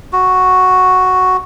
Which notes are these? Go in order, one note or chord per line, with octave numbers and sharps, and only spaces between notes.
F#4